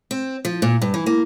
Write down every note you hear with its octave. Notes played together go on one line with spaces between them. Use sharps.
C4
F3
A#2
G2
E3
A#3